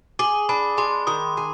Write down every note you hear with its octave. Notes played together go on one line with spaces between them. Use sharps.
G#4 D6
D4 B5
G#3 C6
D#3 D#6
G#4